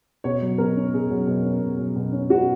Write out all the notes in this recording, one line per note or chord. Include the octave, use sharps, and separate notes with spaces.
B2 C#5
F#3
B2 A#4
C#4
B2 G#4
F#3
B2
C#4
B2
F#3
B2
C#4
B2 F#4